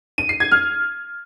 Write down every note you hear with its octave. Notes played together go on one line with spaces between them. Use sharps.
D#7
C7
G#6
F6